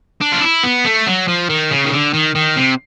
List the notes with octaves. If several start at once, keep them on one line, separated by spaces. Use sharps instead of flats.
D4
F4
E4
B3
A3
F#3
F3
D#3
C#3
D#3
D3
D#3
D#3
C3